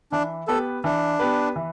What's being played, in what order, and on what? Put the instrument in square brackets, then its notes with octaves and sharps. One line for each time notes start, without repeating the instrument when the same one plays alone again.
[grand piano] E3 [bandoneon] D4
[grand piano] B3 G4 B4 [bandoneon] A4
[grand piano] E3 [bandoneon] D4
[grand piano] B3 G4 B4
E3